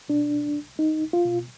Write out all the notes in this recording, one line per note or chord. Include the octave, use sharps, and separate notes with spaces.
B2 D4
C2
C2
C2 D#4
C2
F4
B2